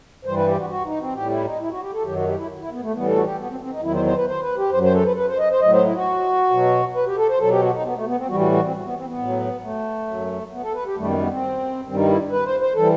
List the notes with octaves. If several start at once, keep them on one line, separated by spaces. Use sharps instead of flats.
G2 E3 G3 C5
B4
G4
F#4
F#4
D#4
C4
A2 G3 G4
E4
D#4
E4
F#4
G4
A4
F#2 D#3 F#3 G4
F#4
G4
E4
E4
B3
A3
A2 E3 G3 B3
A4
F#4
G4
B3
C4
C4
D#4
E2 D#3 F#3 E4
C5
C5
B4
C5
B4
G4
F#2 F#3 C5
C5
A4
B4
B4
C5
D#5
C5
A2 F#3 D#5
C5
E4
F#4
B2 F#3
B4
G4
A4
C5
B2 F#3 A4
G4
F#4
D#4
B3
A3
B3
C4
A2 E3 G3 F#4
F#4
F#4
C4
B3
C4
B3
A2 F#3
A3
F#2 F#3
B3
A4
B4
G4
F#2 D#3 G3 A3
B3
B3
C4
G2 D#3 G3 C4
D#4
E4
B4
C5
C5
E3 G3 A4